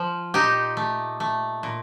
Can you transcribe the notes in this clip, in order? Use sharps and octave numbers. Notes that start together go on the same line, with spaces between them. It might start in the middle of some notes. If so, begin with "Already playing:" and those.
Already playing: F3
A#2 D#4 G4
A3
A3
A#2